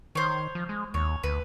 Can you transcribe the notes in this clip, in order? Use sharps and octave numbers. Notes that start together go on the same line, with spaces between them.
D#3 C5 C#5
F3
G#3
D#2 C#5
D2 B4